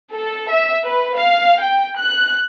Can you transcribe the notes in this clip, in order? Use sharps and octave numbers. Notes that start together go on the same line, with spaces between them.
A4
E5
B4
F5
G5
F#6